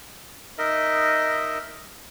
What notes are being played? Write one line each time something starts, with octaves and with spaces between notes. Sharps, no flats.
D#4 A#4 D#5 E5